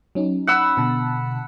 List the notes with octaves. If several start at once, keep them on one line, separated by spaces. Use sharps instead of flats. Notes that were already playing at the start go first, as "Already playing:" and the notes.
F#3 C#4 D#4
F#5 B5 E6
B2 D3 A5